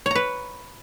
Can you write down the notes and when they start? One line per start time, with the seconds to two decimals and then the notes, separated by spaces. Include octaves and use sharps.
0.06 C#5
0.11 A#5
0.15 B4